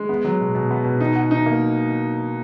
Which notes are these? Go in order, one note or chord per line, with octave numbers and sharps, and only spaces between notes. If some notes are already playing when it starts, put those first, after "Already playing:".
Already playing: G#3
B3
F#3
B2
B2
B3
B2
D#4
F#4
D#4
A#3